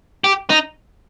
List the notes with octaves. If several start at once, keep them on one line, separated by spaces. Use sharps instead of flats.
G4
D#4